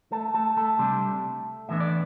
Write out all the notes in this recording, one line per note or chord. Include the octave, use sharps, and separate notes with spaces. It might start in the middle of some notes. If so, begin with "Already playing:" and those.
A3 A4
A3 A4
A3 A4
C3 G3 D4
A2 E3 B3 D4 E5
D5